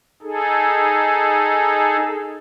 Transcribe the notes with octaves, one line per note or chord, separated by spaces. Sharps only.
D#4 G#4 A4